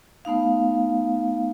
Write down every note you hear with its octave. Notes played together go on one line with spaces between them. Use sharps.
A3 B3 D#4 F5